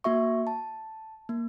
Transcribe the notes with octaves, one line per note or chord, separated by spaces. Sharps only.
A#3 F#4 E5 C#6
A5
A#3